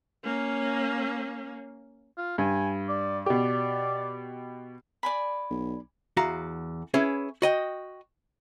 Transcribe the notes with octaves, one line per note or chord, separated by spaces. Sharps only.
A#3 C#4
F4
G2 G#5
D5
B2 G4 D5
D5 G#5 B5
B1
E2 F#4 F5 A#5
C#4 E4 G#4 B4
F#4 D#5 G5